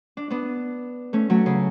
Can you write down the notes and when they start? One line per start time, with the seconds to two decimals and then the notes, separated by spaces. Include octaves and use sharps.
0.17 D4
0.30 B3 D4
1.13 A3 C#4
1.30 F#3 A3
1.46 C#3